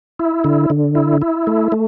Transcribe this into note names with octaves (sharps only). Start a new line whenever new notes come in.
E4
D3
D3
E4
E4
A3
A3